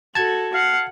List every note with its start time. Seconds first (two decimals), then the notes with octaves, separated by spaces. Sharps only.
0.15 F#4 A4 A5 G#6
0.54 F5 F#5